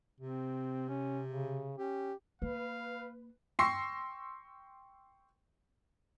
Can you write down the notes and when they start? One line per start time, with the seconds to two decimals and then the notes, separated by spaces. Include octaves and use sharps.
0.20 C3 C4
0.88 C#4
1.26 C#3
1.78 C#4 G4
2.42 A#3 B4 F5
3.59 G5 C6 C#6 E6 A#6 C7